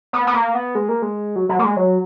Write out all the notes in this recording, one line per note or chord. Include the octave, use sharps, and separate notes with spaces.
B3
B3
A#3
B3
G#3
A#3
G#3
F#3
F#3
A#3
G#3
F#3